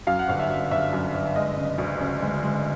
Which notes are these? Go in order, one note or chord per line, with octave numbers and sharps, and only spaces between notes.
F#2 F5
F#5
G1 F5
E5
F#2
G1 E5
F#2
G1
G#3 D#5
C#3
D2
C#3
G#3
G#3